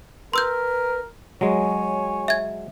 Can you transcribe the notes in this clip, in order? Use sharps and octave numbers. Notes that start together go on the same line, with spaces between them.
A#4 B4 C6 E6 G6
F#3 G#3 C#5 G#5
E5 G#6